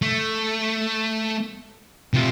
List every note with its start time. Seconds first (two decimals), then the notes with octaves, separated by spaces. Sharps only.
0.02 A3
2.14 C3 F4